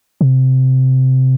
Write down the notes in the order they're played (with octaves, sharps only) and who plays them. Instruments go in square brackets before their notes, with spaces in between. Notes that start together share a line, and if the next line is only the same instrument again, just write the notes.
[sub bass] C3